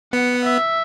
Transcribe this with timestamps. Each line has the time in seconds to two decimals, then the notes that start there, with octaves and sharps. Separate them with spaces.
0.13 B3 F#5
0.44 E5